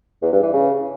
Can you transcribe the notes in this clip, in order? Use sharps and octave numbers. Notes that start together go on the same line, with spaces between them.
E2
G2
E3
C#3